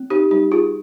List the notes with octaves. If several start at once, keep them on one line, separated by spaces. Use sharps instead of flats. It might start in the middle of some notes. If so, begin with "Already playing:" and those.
Already playing: C4
D#4 G4
G3 D#4 G4
F4 G#4